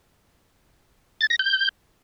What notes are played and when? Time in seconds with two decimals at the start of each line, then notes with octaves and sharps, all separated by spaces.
1.21 A6
1.30 A#6
1.39 G6